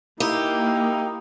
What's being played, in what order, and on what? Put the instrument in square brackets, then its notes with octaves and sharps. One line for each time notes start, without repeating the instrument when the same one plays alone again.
[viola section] A#3 [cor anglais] D#4 [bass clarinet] E4 [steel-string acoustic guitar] G4